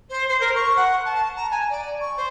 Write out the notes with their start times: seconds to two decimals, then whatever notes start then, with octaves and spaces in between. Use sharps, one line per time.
0.09 C5
0.28 C5
0.40 A#4
0.55 C#6
0.76 F#5
1.05 A5
1.36 A#5
1.51 G#5
1.69 D5
2.00 C#6
2.16 C5